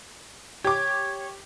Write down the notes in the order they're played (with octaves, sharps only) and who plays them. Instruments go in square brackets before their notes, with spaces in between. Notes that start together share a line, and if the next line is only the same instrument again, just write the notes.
[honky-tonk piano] G4 D6 [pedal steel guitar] C#5